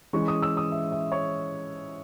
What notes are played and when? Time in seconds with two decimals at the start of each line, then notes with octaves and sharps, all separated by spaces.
0.13 E3 G#3 C#4 C#6
0.28 D#6
0.42 E6
0.57 D#6
0.72 E5
0.92 E5
1.12 C#5